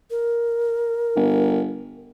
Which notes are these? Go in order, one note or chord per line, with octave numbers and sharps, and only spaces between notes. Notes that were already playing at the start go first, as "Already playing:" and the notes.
A#4
G1